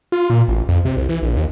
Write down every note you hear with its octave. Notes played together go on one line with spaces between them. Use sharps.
F4
A#2
A1
F2
C3
C2
E3
A#1
D#2